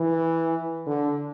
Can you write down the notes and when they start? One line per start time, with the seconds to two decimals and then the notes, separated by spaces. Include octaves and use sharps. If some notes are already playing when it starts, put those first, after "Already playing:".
Already playing: E3
0.86 D3